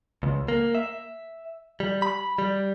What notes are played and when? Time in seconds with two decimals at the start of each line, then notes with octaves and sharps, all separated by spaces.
0.23 C#2
0.48 A#3
0.75 E5
1.80 G3
2.02 B5
2.38 G3